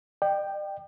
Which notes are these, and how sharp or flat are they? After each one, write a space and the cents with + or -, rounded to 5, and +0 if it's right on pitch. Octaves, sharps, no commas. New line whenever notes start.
D5 +45 G5 +0